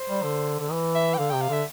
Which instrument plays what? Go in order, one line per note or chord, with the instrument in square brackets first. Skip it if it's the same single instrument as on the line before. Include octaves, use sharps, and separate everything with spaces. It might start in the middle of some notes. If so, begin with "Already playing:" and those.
Already playing: [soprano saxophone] C5
[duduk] G3
D3
D3
E3
[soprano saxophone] E5
G5
[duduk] D3 [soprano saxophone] F5
[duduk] C3 [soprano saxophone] G5
[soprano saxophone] F5
[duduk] D3 [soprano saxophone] E5